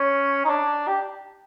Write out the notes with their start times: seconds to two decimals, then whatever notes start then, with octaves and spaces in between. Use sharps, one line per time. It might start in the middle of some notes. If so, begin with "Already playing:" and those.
Already playing: C#4
0.45 D#4
0.49 D4
0.88 G4